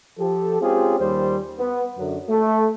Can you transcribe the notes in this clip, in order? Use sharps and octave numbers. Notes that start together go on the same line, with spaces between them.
F3 G4 A4
G#3 C4 C#4 F4 G4 G#4
D#2 G3 C5
B3
F#2 D3 F#3
A3